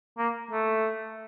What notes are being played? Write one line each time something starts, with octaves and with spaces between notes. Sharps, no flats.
A#3
A3